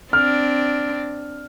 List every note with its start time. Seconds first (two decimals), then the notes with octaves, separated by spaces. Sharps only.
0.13 C4 D4 F6